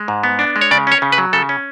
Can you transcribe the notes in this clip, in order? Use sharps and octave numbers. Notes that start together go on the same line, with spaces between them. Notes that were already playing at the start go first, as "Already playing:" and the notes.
Already playing: G#3
G#2
B3
D4
G#3
C#5
C#3 D5
C#4 C#5
C#3
B4
F#3
C#3 A4
C#4